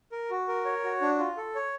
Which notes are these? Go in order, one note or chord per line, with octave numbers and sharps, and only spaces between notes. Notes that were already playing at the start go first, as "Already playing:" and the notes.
A#4
F#4
A#4
C#5
F#4
D4
F4
A4
C#5